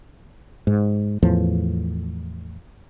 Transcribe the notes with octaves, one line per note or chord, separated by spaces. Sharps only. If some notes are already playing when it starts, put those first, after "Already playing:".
G#2
E2 A2 F3